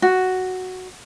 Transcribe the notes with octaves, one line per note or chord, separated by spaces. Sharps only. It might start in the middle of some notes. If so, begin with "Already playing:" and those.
F#4